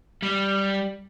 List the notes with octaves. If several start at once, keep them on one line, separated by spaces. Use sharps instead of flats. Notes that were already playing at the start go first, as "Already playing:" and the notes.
G3